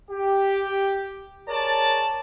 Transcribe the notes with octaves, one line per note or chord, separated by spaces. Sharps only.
G4
G#4 A#4 C#5 D5 A5